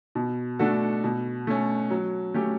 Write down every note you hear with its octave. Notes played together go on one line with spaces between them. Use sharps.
B2
A3 D4 F#4 A4
B2
A3 C#4
F#3
A3 C#4 G4